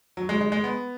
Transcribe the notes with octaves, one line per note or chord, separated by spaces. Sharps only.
F#3
G#3
G#3
G#3
B3